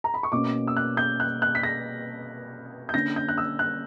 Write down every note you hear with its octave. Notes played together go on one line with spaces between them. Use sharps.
A#5
B5
C#6
B2 A#3 C#4 D6
E6
F#6
G6
F#6
F#6
B6
A#6
G6
D3 A#3 C#4 A#6
G6
F#6
E6
F#6